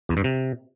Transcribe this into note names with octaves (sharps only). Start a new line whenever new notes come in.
E2
G2
C3